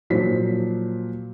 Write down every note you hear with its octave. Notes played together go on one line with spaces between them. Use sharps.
A#2 F3 F#3 C5 B6